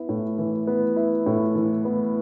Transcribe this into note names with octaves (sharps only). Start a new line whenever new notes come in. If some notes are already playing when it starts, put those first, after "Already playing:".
Already playing: B3 E4
A2
E3
B3
E4
A2
E3
B3